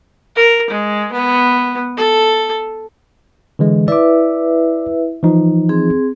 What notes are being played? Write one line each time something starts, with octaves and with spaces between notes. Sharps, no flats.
A#4
G#3
B3
A4
D3 E3 G#3
E4 B4 D5 E5 D6
E3 F3 D#4
C4 G#4